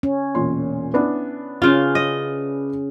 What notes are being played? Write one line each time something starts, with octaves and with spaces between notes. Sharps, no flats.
C#4
E1 A#2 C6
B3 D4 E4
C#3 C#4 F4
D#5